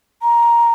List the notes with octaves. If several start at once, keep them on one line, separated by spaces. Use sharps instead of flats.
A#5